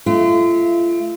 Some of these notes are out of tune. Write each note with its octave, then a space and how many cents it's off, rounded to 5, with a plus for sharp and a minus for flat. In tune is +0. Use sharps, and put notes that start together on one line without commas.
A3 -25 F4 -35